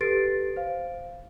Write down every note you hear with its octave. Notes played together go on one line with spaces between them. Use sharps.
G4 A4 B4 A6 C7 D7
C5 F5